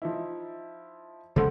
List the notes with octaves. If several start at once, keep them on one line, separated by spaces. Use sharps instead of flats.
F3 D#4 E4
C#3 G#3 A3 G4 A4 C5 F#5 C6